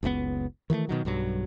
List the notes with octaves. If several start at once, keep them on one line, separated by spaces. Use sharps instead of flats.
F#1 C#2 C#3 B3
D#3 E3 G3 A3
B2 D#3 F#3
B1 G2 F#3